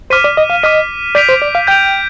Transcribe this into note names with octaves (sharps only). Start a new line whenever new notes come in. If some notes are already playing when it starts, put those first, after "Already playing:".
C5 D6 F6 B6 D#7
D5
D#5
F5
D#5 D6 F6 B6 D#7
D5 G6 B6 D7 F7
C5
D5
F5
G5 G6 B6 D7 F7